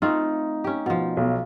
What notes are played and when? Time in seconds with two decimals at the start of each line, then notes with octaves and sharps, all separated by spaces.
0.02 A3 C4 D#4 F4
0.64 C#4 G4
0.86 B2 F3
1.17 B1